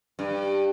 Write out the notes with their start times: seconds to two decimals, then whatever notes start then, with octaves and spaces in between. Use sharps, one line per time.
0.19 G2